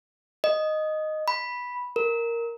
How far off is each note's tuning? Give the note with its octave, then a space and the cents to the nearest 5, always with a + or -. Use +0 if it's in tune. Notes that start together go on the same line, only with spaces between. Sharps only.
D#5 -5
B5 -5
A#4 -5